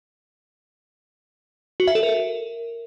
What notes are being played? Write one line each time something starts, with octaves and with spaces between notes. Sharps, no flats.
F#4
E5
A4
A#4